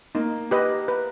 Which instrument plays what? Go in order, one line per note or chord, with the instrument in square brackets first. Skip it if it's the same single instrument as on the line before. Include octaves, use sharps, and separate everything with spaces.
[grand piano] A#3 [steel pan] D#4
[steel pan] G4 B4 D#5
B4